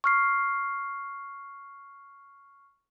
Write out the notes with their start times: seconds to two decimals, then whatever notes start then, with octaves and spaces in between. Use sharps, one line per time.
0.04 C#6 F6 C7